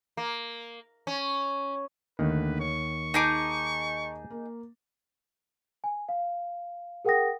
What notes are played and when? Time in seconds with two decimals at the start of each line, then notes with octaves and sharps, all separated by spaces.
0.17 A#3
1.07 C#4
2.19 D#2 D3 D#3 A3 B4
2.60 C#5 C#6
3.14 D#4 G#4 A5 A#5 D6
4.30 A#3
5.84 G#5
6.09 F5
7.05 G#4 A#4 F#5 G5 D#6 A#6